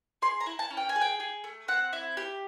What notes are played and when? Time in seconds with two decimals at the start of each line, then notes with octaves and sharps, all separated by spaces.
0.22 G#4 C6
0.40 A#5
0.46 E4
0.59 A5
0.70 C#4
0.77 G5
0.89 G#5
0.96 G#4
1.01 G5
1.20 G#4
1.44 A3
1.68 C4 F#5
1.93 E4
2.17 G4